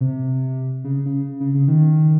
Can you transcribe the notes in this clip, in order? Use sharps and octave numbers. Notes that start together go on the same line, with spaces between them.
C3
C#3
C#3
C#3
C#3
D#3